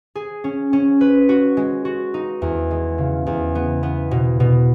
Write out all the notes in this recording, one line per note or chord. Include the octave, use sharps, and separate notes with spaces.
G#4
C#4
C#4
B4
F#4
G#3
F#4
D#4
E2
G#3
C#3
E2
B3
B3
B2
B2